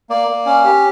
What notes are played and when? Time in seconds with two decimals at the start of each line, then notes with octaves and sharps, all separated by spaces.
0.10 A#3 D5
0.28 A#3
0.46 C#4
0.64 G4